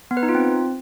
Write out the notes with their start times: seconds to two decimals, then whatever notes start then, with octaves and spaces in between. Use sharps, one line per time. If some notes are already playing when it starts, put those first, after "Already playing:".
0.11 B3
0.17 B4
0.23 D#4
0.29 F4
0.35 C4